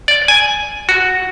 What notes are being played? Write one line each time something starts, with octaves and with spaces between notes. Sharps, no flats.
D5
G#5
F#4